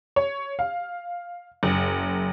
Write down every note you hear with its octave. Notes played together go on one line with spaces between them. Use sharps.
C#5
F5
F#1